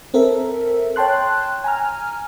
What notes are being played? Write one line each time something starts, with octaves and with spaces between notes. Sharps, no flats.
C4 A4 A#4 E5
C#5 G5 A5 C6 F#6
G#5 A#5 F6